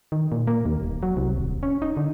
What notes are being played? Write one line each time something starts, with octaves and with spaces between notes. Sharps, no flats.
D#3
A#2
A#3
D#2
D#1
F#3
C2
D#1
C#4
D#4
D3